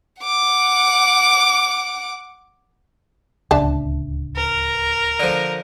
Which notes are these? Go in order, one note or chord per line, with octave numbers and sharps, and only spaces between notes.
F#5 D6
D1 C#2 D4 E5 A5
A#4
D3 F3